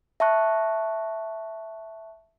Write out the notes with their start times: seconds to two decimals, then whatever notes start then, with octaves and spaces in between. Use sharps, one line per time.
0.20 E5 A5 C#6 F#6